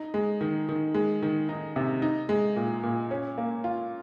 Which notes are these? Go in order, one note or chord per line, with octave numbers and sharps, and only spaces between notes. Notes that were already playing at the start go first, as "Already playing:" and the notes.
Already playing: D#4
G#3
D#3
D#3
G#3
D#3
D#4
C3
D#4
G#3
A#2
A#2
C#4
A#3
F4